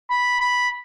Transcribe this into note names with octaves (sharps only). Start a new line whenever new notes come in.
B5
B5